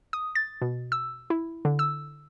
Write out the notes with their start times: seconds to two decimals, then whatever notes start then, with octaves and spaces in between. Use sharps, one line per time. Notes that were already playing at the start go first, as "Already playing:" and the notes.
0.13 D#6
0.35 A6
0.62 B2
0.92 E6
1.30 E4
1.65 D3
1.79 E6